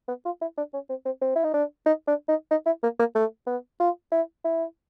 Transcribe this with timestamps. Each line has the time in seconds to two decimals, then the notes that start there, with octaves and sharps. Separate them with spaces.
0.08 B3
0.25 F4
0.41 E4
0.58 D4
0.74 C#4
0.89 C4
1.05 C4
1.21 C4
1.36 E4
1.44 D#4
1.54 D4
1.86 D#4
2.08 D4
2.29 D#4
2.51 D#4
2.66 E4
2.83 A#3
3.00 A#3
3.15 A3
3.47 B3
3.80 F4
4.12 E4
4.45 E4